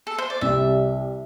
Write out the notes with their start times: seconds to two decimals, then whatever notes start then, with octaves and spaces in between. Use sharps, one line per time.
0.07 A4
0.18 C5
0.30 D5
0.41 C2 C3 G3 E5